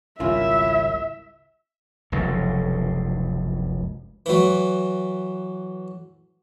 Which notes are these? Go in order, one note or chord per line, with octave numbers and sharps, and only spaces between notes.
G#1 C#2 G3 C#4 E4 F4 A#4 E5
F1 C#2 F#2
E3 F#3